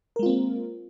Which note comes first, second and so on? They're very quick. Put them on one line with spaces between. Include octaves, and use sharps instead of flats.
A#4 G#3 F4 C4 A#3